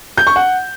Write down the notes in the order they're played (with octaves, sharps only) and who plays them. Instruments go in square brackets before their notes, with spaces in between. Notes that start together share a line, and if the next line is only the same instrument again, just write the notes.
[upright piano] G6
C#6
F#5